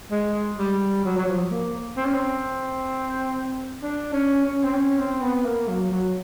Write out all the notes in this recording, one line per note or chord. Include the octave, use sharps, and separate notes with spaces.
G#3
G3
F#3
F#3
F3
A#3
C4
C#4
C4
D4
C#4
C#4
C4
C#4
C4
B3
A#3
F#3
F#3